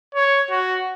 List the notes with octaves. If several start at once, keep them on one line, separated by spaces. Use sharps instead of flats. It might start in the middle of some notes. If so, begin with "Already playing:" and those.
C#5
F#4